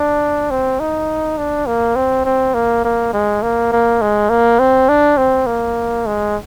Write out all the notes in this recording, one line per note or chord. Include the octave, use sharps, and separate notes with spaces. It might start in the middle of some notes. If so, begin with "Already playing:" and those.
Already playing: D4
C4
D#4
D4
A#3
C4
C4
A#3
A#3
G#3
A#3
A#3
G#3
A#3
C4
D4
C4
A#3
G#3